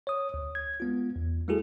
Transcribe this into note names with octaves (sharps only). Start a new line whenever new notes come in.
C#5 D#6
D2
G#6
G#3 B3 F4
E2
G3 A3 E4 F#4 G#4 A4